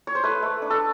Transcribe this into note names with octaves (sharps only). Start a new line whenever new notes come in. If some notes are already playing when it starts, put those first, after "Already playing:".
C#5
C5
A3 B4
A3
D4
A4